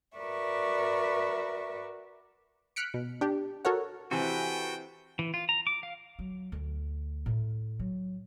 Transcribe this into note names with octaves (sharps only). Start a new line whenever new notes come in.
F#4 A#4 B4 D5 E5 C#6
F6 F#6 B6 C#7 D7
B2
D4 G4
F#4 A4 A#4 C#5 F#5
C3 E3 C4 F#4 A4 B4 G5 G#5
E3
F4
A#5
D6
F5
F#3
D2
A2
F#3